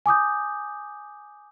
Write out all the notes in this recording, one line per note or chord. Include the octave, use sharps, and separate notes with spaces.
G#5 D6 D#6 G6